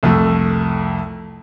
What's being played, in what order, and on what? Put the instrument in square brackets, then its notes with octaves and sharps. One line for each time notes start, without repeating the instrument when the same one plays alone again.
[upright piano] C2 F2 A3